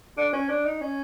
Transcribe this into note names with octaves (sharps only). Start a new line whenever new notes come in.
D4
C#4
D4
D#4
C#4